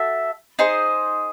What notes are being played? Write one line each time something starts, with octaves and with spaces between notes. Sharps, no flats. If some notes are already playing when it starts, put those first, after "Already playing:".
Already playing: F#4 A4 E5
D#4 G#4 C5